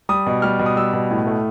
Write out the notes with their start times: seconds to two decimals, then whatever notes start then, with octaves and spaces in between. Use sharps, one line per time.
0.09 G3 D#6
0.27 B2
0.42 G3 F6
0.59 B2
0.66 D#6
0.77 G3 E6
0.93 B2
1.11 A2
1.27 A3